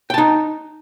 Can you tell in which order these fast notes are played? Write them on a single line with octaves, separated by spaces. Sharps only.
G5 A5 D#4